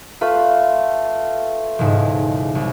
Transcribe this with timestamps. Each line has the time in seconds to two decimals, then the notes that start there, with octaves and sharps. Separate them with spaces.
0.21 A3 F4 B4
1.79 E1 C#2 G#2
2.55 C2